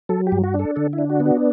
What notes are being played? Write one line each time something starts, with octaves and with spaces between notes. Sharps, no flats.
F#3 A4
G4
G2
F#4
D4
A4
D3 A4
E4
D4
F#4
B3
F#4